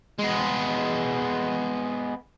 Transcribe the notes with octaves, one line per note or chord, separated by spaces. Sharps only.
G#3 B3